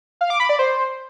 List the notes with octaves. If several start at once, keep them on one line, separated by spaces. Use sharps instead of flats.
F5
D6
B5
D5
C5